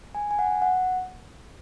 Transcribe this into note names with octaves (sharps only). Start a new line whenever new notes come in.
G#5
G#5
F#5
F#5